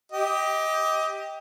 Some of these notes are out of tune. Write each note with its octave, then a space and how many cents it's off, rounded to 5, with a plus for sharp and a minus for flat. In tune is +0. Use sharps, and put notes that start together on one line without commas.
G4 +5 D#5 +25